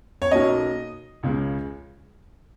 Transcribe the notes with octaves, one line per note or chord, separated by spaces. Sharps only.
C#5
B1 B2 A#3 C#4 D#5
C#2 C#3 G#3 C#4